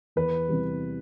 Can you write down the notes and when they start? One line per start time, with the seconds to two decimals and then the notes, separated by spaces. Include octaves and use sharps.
0.16 E2 B4
0.48 C3 E3 G3